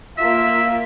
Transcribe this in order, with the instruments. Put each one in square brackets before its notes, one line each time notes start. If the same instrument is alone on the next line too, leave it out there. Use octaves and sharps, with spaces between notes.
[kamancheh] A#3 F4 [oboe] E5